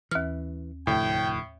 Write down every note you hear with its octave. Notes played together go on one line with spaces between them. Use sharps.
D#2 E3 F6
F1 D2 A2 D3 G5